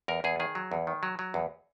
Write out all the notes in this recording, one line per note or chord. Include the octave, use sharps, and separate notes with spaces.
E2 A#4
E2 G#4
D#3 G#4
F#3
E2
D#3
F#3
F#3
E2